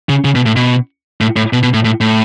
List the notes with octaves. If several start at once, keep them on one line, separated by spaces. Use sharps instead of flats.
C#3
C#3
B2
A2
B2
A2
A2
B2
B2
A2
A2
A2